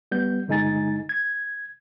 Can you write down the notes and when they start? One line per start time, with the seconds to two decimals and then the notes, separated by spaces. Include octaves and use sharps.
0.12 G3 B3 G6
0.48 G1 D3 G#3 D#4 G#5 A6
1.09 G#6